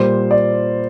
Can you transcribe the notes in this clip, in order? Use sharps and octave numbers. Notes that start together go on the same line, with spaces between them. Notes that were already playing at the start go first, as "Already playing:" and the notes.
Already playing: A#2 G3 C5
D5